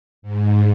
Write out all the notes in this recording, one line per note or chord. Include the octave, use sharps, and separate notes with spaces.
G#2